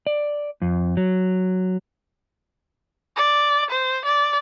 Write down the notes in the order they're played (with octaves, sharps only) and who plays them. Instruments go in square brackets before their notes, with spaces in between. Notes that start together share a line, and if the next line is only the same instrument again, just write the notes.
[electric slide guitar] D5
F2
F#3
[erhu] D5
C5
D5